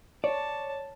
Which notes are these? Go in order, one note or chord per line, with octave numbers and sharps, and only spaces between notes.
C#5 D5 A5